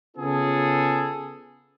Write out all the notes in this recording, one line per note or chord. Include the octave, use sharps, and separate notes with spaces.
C#3 B3 F4 G#4 A4